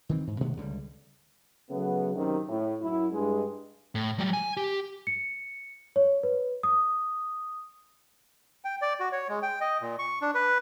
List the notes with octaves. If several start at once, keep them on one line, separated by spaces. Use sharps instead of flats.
D#3 E3 C4
G#2
B2 D#3 A3 B3
C#2 D3 F3 G3
C#3 F#3 A3 B3
F#2 C3 D#3
A2
F#2 E4
G2 G#3
A2
F#3 G3
G#5
G4
C#7
C#5
B4
D#6
G5
D5
F#4
C#5
G#3
G5
D#5
A#2
C#6
D4
B4